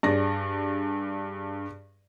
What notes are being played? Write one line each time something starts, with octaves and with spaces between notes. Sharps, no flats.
G2 G#4 D5 A#6